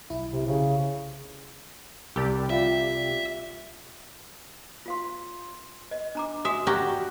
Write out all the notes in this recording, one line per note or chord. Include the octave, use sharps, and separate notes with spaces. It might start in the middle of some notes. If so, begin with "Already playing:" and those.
B1 E4
C3
C#3
C2 G4 A#4 D5
F4 E5 F5
F4 F5 C6
D#5
D4 A#5 D6
F#4 E5 G#5 D#6
F#4 G4 A#4 D5